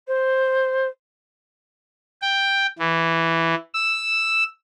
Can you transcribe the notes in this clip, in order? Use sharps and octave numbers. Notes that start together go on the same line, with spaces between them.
C5
G5
E3
E6